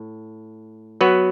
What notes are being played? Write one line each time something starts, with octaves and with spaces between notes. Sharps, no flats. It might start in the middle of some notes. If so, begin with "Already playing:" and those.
Already playing: A2
F#3 B3 F#4 B4